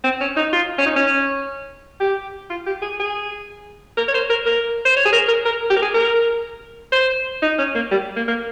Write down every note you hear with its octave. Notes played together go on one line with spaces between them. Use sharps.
C4
C#4
D#4
F4
C#4
D#4
C#4
G4
F4
G4
G#4
G#4
A#4
C#5
C5
A#4
A#4
C5
C#5
G#4
A#4
A#4
A#4
G4
A#4
G#4
A#4
C5
D#4
C#4
A#3
G3
A#3
A#3